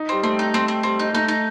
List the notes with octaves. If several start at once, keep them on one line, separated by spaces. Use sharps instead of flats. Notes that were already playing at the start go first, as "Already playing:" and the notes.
Already playing: D#4
G3 C4
A3 C4
D#4
A3 C4
C4
G3 C4
D#4
G3
A3 D#4
D#4